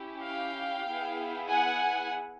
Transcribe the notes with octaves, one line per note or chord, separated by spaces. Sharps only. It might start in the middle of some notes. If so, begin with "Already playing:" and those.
Already playing: C#4 E4 G4
F5 G5
B3 E4 G#4
F#5 G#5